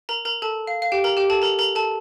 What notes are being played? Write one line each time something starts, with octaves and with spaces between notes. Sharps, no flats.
A#4 A#5
A#4 A#5
A4 A5
F5
F5
G4 G5
A#4 A#5
G4 G5
A4 A5
A#4 A#5
A#4 A#5
A4 A5